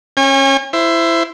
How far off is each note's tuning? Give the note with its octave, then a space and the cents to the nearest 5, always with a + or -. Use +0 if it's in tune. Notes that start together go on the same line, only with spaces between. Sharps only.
C#4 -25 G#5 -40
E4 +15 C5 +0